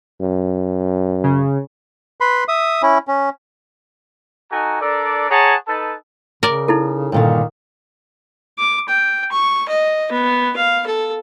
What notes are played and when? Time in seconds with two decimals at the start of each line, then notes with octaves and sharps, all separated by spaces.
0.21 F#2
1.24 C#3
2.21 B4 B5 C6
2.48 E5 D#6
2.82 C#4 E4
3.07 C#4
4.51 D#4 F#4 A4 G#5 A#5
4.81 D4 A4 A#4 D5
5.30 G#4 C#5 F#5 A5 A#5
5.67 D#4 A4 B4 A5
6.43 C#3 A#4 D5
6.68 D#4 E4 A4
7.12 G2 A#2 D3 D#3
8.59 D6
8.88 G5
9.32 C#6
9.68 D#5
10.11 B3
10.56 F5
10.86 A4